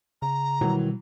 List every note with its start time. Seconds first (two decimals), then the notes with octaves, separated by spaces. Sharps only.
0.22 C#3 A#5
0.61 B2 D#3 E3 F#3 G3